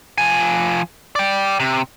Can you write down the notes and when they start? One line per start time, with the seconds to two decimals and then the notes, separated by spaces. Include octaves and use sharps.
0.18 F3 G#5
1.16 D5 G5
1.60 C3